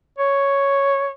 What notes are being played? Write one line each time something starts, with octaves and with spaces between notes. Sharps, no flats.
C#5